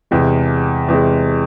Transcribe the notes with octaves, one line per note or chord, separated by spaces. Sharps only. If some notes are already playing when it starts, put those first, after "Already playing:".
E2 C3 G#3
E2 C3 G#3